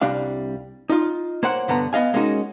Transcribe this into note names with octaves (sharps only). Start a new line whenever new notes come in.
C2 G3 D4 F5
D#4 F4
A#3 C5 C#5 F#5
G2 D3 B3 A#5
B3 D#5 F5 G#5
G#3 A#3 C#4 D#4 F#4